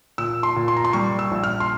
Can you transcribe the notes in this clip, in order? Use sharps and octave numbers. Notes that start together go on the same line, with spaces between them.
A#2 E6
C6
A#2
C6
A#5
C6
G3 C#6
E6
A#1
F6
C6